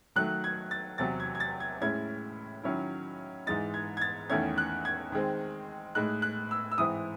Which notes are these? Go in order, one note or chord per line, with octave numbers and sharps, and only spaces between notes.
D#3 F#3 A3 F#6
G#6
A6
E2 C3 F#3 A6
G#6
G#6
A6
G#6
A2 G#3 C#4 E4 G#6
D#3 F#3 C#4 E4
G#2 E3 G#3 D#4 A6
G#6
G#6
A6
E2 D#3 A3 C#4 E4 G#6
F#6
G#6
D#3 G#3 C4
A2 G#3 D#4 F#6
F#6
E6
E6
G#2 E3 C4 E4 D#6